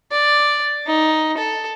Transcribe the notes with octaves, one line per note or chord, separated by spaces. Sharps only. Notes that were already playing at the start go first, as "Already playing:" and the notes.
D5
D#4
A4